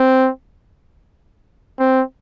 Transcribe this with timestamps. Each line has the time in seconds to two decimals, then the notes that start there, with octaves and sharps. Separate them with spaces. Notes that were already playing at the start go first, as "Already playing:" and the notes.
Already playing: C4
1.79 C4